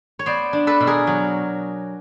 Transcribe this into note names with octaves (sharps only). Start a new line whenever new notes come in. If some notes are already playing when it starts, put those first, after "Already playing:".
C#5
B3 C5 D5
D4
A4 B4
B2
G#4 A#4
F#3